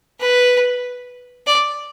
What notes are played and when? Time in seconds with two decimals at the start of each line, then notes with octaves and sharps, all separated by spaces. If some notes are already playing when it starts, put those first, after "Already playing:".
0.20 B4
1.47 D5